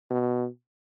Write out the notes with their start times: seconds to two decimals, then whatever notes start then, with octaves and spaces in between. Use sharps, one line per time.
0.11 B2